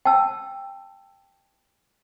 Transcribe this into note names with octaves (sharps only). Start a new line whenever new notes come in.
G5 A5 E6